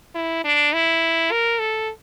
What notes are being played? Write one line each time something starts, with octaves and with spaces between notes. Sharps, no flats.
E4
D4
E4
A#4
A4